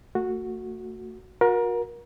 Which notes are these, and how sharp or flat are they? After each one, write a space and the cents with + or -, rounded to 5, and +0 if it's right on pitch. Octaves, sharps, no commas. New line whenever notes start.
A3 +30 F#4 -10
F#4 -35 A#4 +25